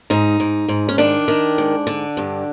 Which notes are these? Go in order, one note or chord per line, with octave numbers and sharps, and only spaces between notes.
G#2 D#4
G#2
G#2
C#4
D#3 D4
D#3
G#2
D3
G2